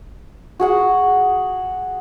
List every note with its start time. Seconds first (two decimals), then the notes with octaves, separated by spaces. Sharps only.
0.60 F#4 G#4 F#5